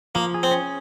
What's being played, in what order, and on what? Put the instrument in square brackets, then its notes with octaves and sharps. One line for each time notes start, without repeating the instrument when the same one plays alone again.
[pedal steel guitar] F3 [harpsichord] A#3
[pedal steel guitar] G#4
[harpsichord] C4
[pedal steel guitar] C#4